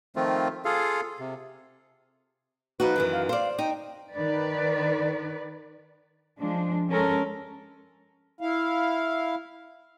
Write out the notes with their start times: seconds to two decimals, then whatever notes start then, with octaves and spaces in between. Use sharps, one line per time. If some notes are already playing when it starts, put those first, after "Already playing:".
0.16 D#3 F3 A3 C4 F4
0.65 F4 G#4 A4 F5
1.19 C3
2.80 F3 D#4 F#4 B4
2.96 F#2 D#3 E3
3.13 F5
3.29 C5 D5 F5
3.58 D#4 G5
4.13 D#3 B4 D5
6.39 F3 G#3 D4
6.90 G#3 C#4 A4 A#4
8.41 E4 F5